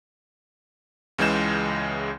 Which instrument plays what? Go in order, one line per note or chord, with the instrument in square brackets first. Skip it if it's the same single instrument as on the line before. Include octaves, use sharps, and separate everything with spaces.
[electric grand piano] C#2 C#3 E3 G#3 G6 E7